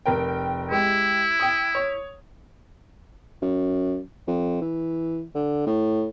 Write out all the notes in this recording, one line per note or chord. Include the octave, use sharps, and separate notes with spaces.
F1 A#4 G5
G#3 E4 G4
G5 D#6
C#5
F#2
F2
E3
D3
A2